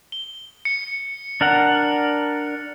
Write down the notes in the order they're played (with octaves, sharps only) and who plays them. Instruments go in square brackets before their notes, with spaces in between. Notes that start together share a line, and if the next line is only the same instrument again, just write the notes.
[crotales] G7
C#7
[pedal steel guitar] D4 A#4 F#5